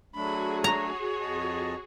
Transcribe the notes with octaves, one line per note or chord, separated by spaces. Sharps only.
F#3 A3 D4 F#4 G#4 B5
C#5 A#5
F2 D#5 A5